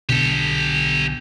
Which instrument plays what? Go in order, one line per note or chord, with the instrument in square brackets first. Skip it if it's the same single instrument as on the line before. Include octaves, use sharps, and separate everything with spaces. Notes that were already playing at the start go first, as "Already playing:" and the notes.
[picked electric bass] B1 B2 D3 [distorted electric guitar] G4 A4